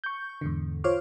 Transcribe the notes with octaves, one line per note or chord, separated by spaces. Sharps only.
C#6 G6
E2 G#2 D3
F4 C5 C#5 C6 D6 F6